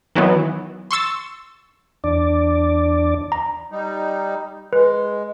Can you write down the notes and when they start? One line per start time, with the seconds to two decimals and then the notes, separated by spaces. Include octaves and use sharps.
0.16 D#3 E3 F#3 B3
0.91 C6 C#6 E6 A6
2.04 E2 D4 D5
3.32 A#5
3.72 G3 D#4
4.73 G#3 B4